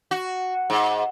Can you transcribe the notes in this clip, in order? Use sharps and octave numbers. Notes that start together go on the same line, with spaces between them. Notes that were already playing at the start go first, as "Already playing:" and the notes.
F#4
G#2